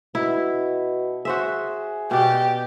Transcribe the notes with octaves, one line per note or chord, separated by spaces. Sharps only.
B2 E4
F#4 G#4 C5 E5
B2 G4 D5